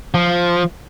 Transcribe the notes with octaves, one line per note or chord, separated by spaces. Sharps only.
F3